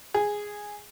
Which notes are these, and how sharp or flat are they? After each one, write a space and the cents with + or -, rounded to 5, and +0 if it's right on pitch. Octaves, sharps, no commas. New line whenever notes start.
G#4 -5